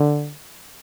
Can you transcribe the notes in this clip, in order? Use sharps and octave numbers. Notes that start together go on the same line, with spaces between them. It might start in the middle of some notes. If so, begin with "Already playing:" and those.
Already playing: D3